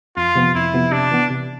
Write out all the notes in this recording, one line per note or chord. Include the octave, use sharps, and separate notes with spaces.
F2 F4
C3 F3 B3
F2 E4
C3 F3 B3
C3 D4
E3 B3
C3